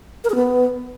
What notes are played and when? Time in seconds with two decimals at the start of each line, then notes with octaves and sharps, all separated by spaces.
0.24 A#4
0.30 G#4
0.35 B3